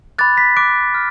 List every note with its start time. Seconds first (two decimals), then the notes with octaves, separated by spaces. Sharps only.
0.18 B5 D6 F#6 A6
0.37 B6
0.57 B5 D6 F#6 D7
0.94 F6